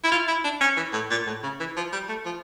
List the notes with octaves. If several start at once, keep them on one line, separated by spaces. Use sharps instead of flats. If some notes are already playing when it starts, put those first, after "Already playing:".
E4
F4
E4
D4
C#4
E3
A2
A#2
A2
C#3
E3
F3
G3
A3
F3